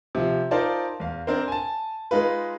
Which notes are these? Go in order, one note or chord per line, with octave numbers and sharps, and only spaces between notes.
C3 F3
D#4 F4 A#4 C5 D5 A5
E2 F5
C4 D4 A#4 C5
G#5 A5
G#3 D#4 F4 B4